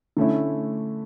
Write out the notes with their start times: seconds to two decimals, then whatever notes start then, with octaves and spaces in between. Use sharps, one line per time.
0.17 D3 A3 C#4 E4